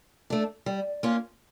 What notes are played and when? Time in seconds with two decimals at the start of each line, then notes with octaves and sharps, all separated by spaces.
0.30 A3 D4
0.66 G3
1.03 A#3 C#4 F4